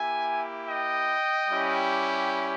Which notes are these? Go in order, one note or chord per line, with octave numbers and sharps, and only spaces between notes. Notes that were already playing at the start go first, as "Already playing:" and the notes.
Already playing: A#3 E4 G4 E5 G#5
D#5 G5
G3 C#4 E4 G4